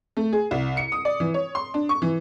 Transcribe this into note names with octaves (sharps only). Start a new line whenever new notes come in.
A3
G#4
C2
C#7
D#6
D5
E3
C#5
C6
D4
C#6
E3